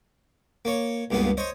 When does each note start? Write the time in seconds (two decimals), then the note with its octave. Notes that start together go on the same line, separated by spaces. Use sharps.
0.65 A#3 C#5
1.11 C#2 G2 A#3 B3 G#4
1.37 C5 C#5 D#5